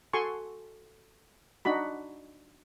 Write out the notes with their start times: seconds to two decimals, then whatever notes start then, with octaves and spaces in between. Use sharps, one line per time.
0.13 F#4 A4 G#5 C6 C#6
1.65 D4 D#4 F#4 B5